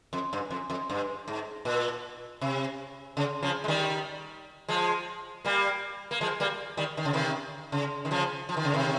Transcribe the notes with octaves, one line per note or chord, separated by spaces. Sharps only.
F2
G2
F2
F2
G2
G#2
A#2
C3
C#3
C#3 F3
G#3
D#3 G3
F3 G#3
G3 A#3
A#3
F3 G#3
G3 A#3
D#3 G3
D#3
C#3
C3 D#3
C#3
D#3
C#3 F3
F3
D#3
C#3
C3 D#3